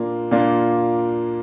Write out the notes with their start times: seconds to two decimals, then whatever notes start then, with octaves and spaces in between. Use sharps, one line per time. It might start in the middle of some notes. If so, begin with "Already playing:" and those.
Already playing: A#2 A#3 D4 F4
0.31 A#2 A#3 D4 F4